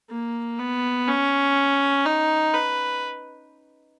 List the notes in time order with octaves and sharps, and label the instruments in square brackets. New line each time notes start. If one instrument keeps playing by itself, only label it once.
[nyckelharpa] A#3
B3
C#4
D#4
B4